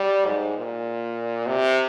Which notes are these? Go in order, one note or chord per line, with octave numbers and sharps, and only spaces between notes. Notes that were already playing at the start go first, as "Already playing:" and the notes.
Already playing: G3
G#2
A#2
C3